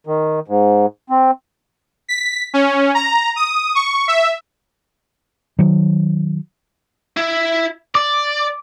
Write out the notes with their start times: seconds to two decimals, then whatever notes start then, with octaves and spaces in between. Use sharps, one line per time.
0.07 D#3
0.48 G#2
1.10 C4
2.08 B6
2.54 C#4
2.95 A#5
3.36 D#6
3.75 C#6
4.08 E5
5.59 D#3 F#3
7.17 E4 E5
7.95 D5 D6